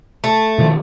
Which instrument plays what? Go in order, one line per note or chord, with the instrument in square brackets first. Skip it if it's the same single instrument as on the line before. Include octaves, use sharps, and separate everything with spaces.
[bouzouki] A3
[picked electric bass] B2 D#3 F3